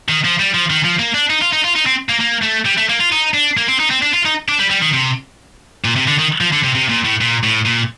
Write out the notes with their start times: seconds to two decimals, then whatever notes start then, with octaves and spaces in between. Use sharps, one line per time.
0.09 D#3
0.25 F3
0.39 G3
0.54 F3
0.70 D#3
0.84 F3
0.99 A#3
1.14 D4
1.30 D#4
1.42 F4
1.53 D#4
1.64 F4
1.75 D#4
1.86 C4
2.09 A#3
2.20 A#3
2.43 A3
2.66 G3
2.78 A3
2.89 A#3
3.00 F4
3.12 D#4
3.34 D4
3.57 A#3
3.68 C4
3.80 D#4
3.91 C4
4.03 D4
4.13 F4
4.25 D#4
4.49 D4
4.59 G3
4.70 G3
4.82 D#3
4.93 C3
5.84 A#2
5.96 C3
6.07 D3
6.19 D#3
6.41 F3
6.52 D3
6.64 C3
6.75 C3
6.90 A#2
7.05 A2
7.21 A#2
7.44 A2
7.66 A#2